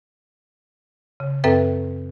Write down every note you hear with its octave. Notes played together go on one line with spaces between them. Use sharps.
C#3
F#2 C4 A4 B4 E5 G5